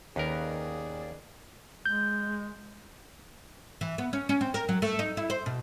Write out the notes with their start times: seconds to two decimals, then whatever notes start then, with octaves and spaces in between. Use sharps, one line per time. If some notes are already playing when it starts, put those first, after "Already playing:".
0.16 D#2 D#3 C#4 G#4 A#4 B4 D5
1.86 G#3 G6
3.81 E3
3.98 B3
4.13 C#4
4.29 C#4
4.41 C4
4.54 A#4
4.69 F#3
4.82 A3
4.99 D#4
5.17 E4
5.30 C5
5.46 B2